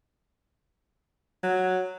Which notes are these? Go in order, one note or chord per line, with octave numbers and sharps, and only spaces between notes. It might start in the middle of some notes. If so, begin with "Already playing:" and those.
F#3